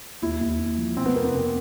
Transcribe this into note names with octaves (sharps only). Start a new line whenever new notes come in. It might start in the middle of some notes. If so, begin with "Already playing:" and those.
D#2 E4
D#2
D#2
F3
C3 C4
B3
F2 A#3
B3
C3 C4